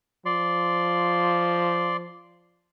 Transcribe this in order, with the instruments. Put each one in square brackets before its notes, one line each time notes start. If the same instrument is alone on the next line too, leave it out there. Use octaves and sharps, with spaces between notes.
[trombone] F3 [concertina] D5 C6